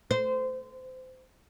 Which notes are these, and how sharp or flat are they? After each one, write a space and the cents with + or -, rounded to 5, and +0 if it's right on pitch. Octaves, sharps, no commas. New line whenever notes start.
C5 -25